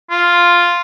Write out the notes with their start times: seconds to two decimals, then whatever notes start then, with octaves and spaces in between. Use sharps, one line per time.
0.11 F4